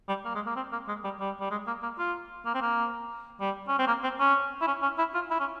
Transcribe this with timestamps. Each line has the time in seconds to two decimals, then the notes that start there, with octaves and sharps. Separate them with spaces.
0.09 G3
0.25 A#3
0.35 G#3
0.46 A#3
0.56 C4
0.72 A#3
0.88 G#3
1.04 G3
1.20 G3
1.40 G3
1.51 G#3
1.67 A#3
1.83 A#3
1.98 F4
2.46 A#3
2.54 C4
2.62 A#3
3.40 G3
3.68 C#4
3.79 C4
3.87 A#3
4.03 C4
4.20 C#4
4.61 E4
4.67 C#4
4.82 C#4
4.98 E4
5.15 F4
5.31 E4
5.40 C#4